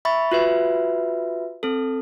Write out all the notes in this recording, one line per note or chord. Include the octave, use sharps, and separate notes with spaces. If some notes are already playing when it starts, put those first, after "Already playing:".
E5 B5 C#6 A6
F4 F#4 B4 E5
C4 A4